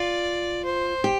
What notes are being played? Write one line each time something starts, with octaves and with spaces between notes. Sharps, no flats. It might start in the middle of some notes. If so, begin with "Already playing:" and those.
Already playing: F4 D5
C5
G4